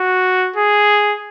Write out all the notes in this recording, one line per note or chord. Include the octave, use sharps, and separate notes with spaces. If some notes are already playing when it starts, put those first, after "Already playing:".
Already playing: F#4
G#4